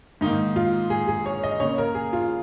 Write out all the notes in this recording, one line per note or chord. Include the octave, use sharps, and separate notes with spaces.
G#2 D#3 A#3 D#4
F4
G#4
G#4
C#5
D#5
C#3 A#3 C#5
A#4
G#4
F4